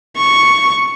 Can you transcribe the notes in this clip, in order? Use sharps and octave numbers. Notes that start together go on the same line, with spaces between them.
C#6